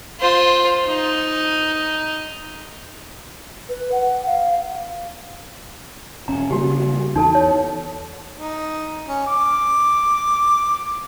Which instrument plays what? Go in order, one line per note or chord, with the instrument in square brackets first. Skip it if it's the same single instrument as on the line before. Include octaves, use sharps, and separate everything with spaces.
[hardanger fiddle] F4 C5
D#4
[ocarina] B4
F#5
F5
[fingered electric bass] E1 C#4 [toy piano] A#5
[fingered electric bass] C#3 G3 A#3 [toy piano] F#4 G4
[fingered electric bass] E2 [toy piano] D#4 A4 A5
[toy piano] C#5
[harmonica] D#4
C#4
D6